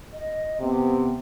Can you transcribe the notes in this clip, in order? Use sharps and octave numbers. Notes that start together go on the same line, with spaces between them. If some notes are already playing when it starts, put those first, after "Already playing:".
D#5
C3 B3